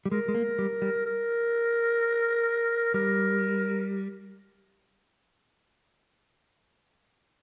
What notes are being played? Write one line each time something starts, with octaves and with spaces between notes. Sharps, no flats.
G3
G#3 A#4
G#3
A#3
G3
G3
A#4
G3 A#4